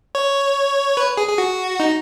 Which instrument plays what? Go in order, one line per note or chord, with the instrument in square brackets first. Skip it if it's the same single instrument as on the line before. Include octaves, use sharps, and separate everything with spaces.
[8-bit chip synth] C#5
B4
G#4
G#4
F#4
D#4